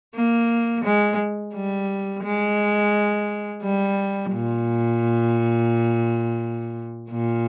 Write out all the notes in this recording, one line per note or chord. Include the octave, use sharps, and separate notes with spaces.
A#3
G#3
G3
G#3
G3
A#2
A#2